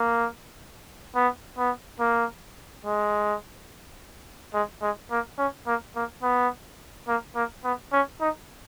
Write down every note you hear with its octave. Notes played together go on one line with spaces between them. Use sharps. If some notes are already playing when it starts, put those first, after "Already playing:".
Already playing: A#3
B3
B3
A#3
G#3
G#3
G#3
A#3
C#4
A#3
A#3
B3
A#3
A#3
B3
C#4
D#4